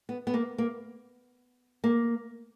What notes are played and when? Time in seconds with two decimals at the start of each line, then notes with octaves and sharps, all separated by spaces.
0.09 B3
0.27 B3
0.34 A#3
0.58 A#3
1.84 A#3